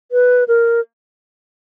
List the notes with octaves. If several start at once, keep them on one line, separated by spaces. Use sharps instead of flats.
B4
A#4